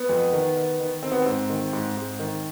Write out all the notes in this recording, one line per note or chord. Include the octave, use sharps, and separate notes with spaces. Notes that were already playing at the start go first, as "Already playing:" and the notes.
Already playing: B3
F2
D#3
D#3
D#3
D#3 C4
B3
G#2 C4
D#3
G#2
G#2
D#3